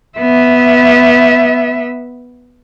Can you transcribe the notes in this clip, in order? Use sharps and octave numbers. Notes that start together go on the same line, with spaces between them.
B3 E5